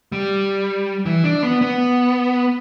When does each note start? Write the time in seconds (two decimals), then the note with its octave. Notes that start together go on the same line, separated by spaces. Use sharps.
0.12 G3
1.06 E3
1.24 D4
1.43 B3
1.61 B3